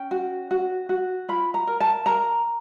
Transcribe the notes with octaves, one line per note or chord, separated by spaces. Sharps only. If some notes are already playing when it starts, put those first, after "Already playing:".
Already playing: C#4 G5
F#4
F#4
F#4
F4 B5
A#5
A#4
A5
A#4 A#5